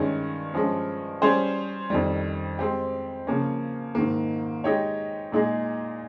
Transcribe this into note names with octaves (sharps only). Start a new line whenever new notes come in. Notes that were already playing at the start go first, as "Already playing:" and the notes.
Already playing: G2 D#3 G#3 C#4
G2 F3 G#3 C#4
G3 C#4 G#4 C5
F2 D#3 G3
G#3 C4 G4
C#3 F3 A#3 C#4
G#2 D#3 A#3
G#3 D#4 G4 C#5
A#2 G#3 D#4 G#4